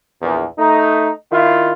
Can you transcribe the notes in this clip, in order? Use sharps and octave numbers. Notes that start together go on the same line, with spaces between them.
A#1 E2
A3 D#4
D#3 E4 F4